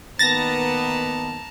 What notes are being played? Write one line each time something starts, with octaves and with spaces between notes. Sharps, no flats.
D#3 A#3 B3 A5 A#5 A6 A#6